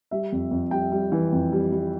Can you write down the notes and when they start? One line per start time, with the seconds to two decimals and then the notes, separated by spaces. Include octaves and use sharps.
0.11 G3 E5
0.32 F2
0.51 F2
0.71 G3 G5
0.92 G3
1.12 E3
1.32 F2
1.52 G3
1.72 G3